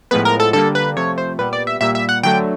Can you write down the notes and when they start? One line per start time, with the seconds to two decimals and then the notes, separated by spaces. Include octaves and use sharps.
0.11 A2 F3 G#3 B3 B4
0.25 A#4
0.40 A4
0.53 D3 G3 A#3 A4
0.75 B4
0.96 C3 F3 A3 C#5
1.18 C5
1.38 A#2 G3 B3 B4
1.53 D5
1.67 E5
1.81 A#2 G3 A#3 E5
1.95 E5
2.09 F#5
2.23 D3 F#3 A3 G5